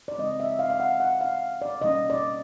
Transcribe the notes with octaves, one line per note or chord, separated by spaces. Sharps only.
D5
C#3 F3 G#3 C4 D#5
E5
F5
F5
F#5
F#5
F5
D5
B2 G3 A#3 C#4 D#5
D5